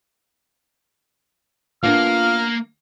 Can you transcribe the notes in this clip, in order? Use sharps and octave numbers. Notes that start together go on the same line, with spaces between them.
A#3 B3 D4 F4 A#4 F6